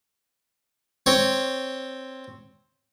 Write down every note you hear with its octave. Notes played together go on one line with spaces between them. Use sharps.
C4 C#5